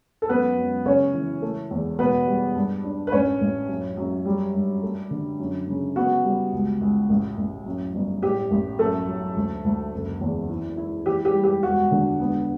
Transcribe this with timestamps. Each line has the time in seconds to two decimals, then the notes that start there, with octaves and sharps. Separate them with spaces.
0.22 A4
0.29 F#2 B3 B4
0.57 F#2
0.86 C#3 C#4 C#5
1.14 E3
1.42 A3
1.71 E2
1.99 B2 B3 B4
2.27 G3
2.56 G2
2.84 D4
3.07 B4
3.12 A1 C#4 C#5
3.41 A1
3.69 F#2
3.97 F#2
4.25 G3
4.54 G2
4.83 A3
5.11 D3
5.39 F#2
5.68 C#3
5.96 B3 F#4
6.24 G3
6.52 C#2
6.81 C#2
7.10 A1
7.37 A1
7.66 F#2
7.94 G1
8.22 A2 G4
8.51 A1
8.79 F#2 A3 A4
9.08 F#3
9.36 D2
9.64 D2
9.92 F#1
10.21 E2
10.49 E4
10.77 E4
11.06 E3 G4
11.25 G4
11.35 G3
11.44 G4
11.63 E1 F#4
11.91 D3
12.20 B3